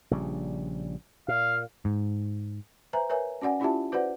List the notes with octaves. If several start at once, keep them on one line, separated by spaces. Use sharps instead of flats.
A#1 C#3 G3
A#2 F5
G#2
B4 C5 E5 G#5 A#5
A#4 B4 C#5 E5 G#5
C#4 F#4 D5 F#5 G#5
C#4 E4 F4 G4 E5 A5
F#4 B4 C5 D5 F#5